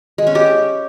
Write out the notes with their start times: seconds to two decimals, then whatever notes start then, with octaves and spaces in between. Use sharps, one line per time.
0.18 G#3
0.27 C#4
0.35 G4